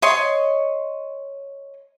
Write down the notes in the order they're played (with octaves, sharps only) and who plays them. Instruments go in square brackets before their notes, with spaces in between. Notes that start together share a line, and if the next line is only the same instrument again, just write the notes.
[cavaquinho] C#5 D#5 C6